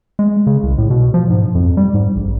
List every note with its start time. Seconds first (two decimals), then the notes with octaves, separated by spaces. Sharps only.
0.19 G#3
0.47 C#3
0.63 C2
0.78 A2
0.90 B2
1.14 F3
1.30 G#2
1.55 F2
1.77 G3
1.94 G#2
2.16 A#1